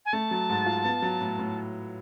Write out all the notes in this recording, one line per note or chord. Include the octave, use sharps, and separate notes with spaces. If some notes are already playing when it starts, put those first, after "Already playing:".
G#5
A3 A5
F#3
G#2
F4
B3
F#3
A2
A2